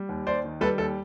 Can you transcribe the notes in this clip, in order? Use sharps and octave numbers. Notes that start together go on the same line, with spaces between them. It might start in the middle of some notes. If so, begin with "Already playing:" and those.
Already playing: G3
D#2
D#2 C5 D5
D#3
G3 A4 B4
D#2 A4